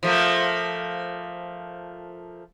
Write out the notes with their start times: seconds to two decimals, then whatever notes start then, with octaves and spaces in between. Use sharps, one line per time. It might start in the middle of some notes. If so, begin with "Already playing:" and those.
0.03 F3 A3 A#3